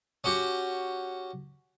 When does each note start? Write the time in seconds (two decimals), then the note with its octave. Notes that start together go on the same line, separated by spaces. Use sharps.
0.24 C#4 F#4 G4